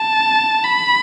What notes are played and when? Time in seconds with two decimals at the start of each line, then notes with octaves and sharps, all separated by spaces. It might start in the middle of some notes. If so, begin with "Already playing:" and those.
Already playing: A5
0.64 B5